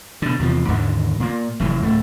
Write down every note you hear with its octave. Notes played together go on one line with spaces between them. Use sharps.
B2 D3
E2 C3 F3
D#2 G#2 D3 D#3
A#2 A#3
F1 F#2 A#2 E3
D1 A3